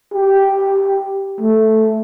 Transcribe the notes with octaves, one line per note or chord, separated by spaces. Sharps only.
G4
A3